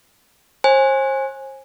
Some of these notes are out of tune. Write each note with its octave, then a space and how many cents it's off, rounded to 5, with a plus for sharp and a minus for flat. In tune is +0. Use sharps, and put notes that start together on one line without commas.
C5 +40 G#5 -5